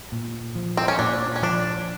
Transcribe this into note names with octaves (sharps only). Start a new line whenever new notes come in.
A#2
F3
C4
C#4
A#2 D4
C#4
F3 D4